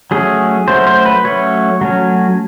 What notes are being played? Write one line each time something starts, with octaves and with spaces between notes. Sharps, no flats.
F#3 A3 C#4 G#4
F#3 A3 C#4 C5
C5
B4
F#3 A3 C#4 C#5
F#3 A3 C#4